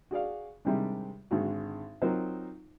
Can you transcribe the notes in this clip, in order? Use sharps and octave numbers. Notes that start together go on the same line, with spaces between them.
F#4 G#4 D5 F5
C3 D#3 G3 G#3 C4 D4
G#1 D3 G#3 F#4
F#3 C4 D#4 F4 A#4 C5